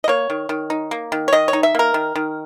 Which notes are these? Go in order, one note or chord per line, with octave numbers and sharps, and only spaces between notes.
D#5
A#3 C#5
D#3
D#3
D#4
A#3
D#3
C#5
D#3 D#5
C#5
D#4
E5
A#3 A#4
D#3
D#3